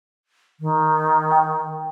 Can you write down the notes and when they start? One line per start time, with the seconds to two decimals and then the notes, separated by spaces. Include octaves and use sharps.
0.60 D#3
1.31 G5